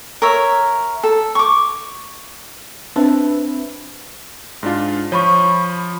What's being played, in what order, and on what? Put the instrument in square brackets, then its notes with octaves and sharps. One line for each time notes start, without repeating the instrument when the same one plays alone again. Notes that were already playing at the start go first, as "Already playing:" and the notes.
[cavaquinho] A#4 C#5 E5
A4
C#6 D6
[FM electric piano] C4 B4 E5 [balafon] D4
[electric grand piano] G#2 D4 F4
[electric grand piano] F3 [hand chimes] C#5 B5 C#6
[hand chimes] B5